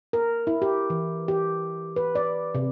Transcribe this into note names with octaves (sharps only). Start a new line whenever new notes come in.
A#4
E4
G4
E3
G4
B4
D5
C3